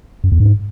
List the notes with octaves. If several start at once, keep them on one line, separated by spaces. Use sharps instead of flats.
F#2
E2
G#2